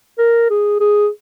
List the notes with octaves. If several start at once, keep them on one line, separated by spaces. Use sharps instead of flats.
A#4
G#4
G#4